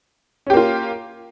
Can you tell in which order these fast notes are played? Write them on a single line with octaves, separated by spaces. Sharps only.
C#4 G4 A#3 F4